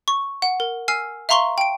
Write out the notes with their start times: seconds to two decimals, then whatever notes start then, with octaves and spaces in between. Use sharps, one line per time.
0.08 C#6
0.42 F#5
0.60 A#4
0.88 G#5 E6 F6 C7
1.29 E5 F5 A#5 C6 C#6 G7
1.58 G5 D7